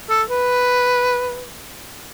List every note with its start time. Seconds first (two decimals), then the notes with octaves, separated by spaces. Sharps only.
0.09 A4
0.29 B4